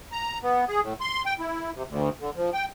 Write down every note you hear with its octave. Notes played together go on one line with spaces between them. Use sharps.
A#5
B3
G#4
A2
C6
G5
E4
C3
D2
D3
F3
G5